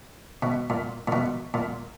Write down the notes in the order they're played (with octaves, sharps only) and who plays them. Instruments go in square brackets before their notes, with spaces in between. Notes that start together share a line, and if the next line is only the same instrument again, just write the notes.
[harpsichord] B2
A#2
A#2
B2
A#2